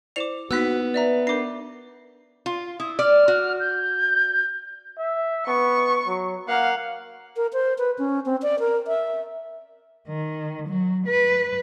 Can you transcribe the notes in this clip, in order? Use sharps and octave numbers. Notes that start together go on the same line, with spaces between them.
E4 C5 D5 D6 E7 F7
A#3 B3 D#4 F#4 E6 F#6 B6
B4 D5 E5 A#5
D4 A#4 D6 C7
F4
E4 D#6
D5 F6
F#4
G6
E5
B3 C#6
F#3
A#3 F5 F#5
A#4
C5
B4
C#4
C4
D5
A#4
E5
D#3
F#3
B4